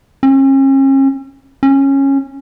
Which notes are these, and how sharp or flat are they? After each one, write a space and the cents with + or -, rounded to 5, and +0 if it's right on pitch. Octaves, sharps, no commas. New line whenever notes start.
C#4 -40
C#4 -15